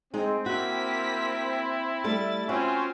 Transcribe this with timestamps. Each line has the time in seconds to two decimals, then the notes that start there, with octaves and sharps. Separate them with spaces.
0.14 G#3 C4 D#4
0.46 A#3 E4 F#4 B6
2.04 G3 A3 A4 A6
2.49 C4 C#4 F4 F#4 C5